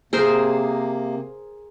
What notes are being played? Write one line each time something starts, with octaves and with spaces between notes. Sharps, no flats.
C3 A#3 G#4 A#4 C5